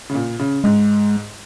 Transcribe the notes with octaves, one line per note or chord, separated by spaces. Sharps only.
C#3
A#2
C#3
G#2 G#3